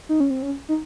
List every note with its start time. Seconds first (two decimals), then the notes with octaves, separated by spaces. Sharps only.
0.09 D#4
0.20 C#4
0.30 C4
0.42 C#4
0.69 D#4